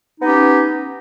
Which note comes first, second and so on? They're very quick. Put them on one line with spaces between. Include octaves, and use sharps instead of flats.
D#4 B3 G4 C#4